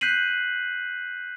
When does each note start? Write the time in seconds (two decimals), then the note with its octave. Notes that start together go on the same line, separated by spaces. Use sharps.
0.01 F#6 G6 B6 C7 D#7 F#7